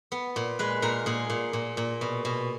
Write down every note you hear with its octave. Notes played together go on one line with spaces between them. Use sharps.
B3
A#2
G#3 B4
A#2 A#4
A#2 G#4
A#2
A#2
A#2
B2
B2